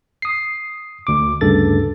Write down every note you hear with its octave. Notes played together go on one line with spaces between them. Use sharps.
D#6 C7
D2 D6
D2 G2 C#3 A4 A6